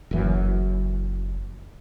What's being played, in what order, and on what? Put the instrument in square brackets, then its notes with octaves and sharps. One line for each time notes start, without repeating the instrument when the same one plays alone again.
[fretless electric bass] F#1 F#2 E3